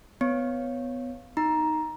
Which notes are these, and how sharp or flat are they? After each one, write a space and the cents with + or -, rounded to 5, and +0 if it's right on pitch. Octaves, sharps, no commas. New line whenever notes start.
B3 +20 C#5 +0
D#4 +0 A#5 +10